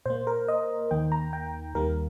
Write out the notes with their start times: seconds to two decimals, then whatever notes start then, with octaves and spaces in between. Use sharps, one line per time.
0.06 A#2 A#3 C5
0.27 A#4
0.48 D#5
0.91 D#2 D#3 A#3 G5
1.12 A#5
1.33 G5
1.74 D#2 D#3 G3 A#3 A#4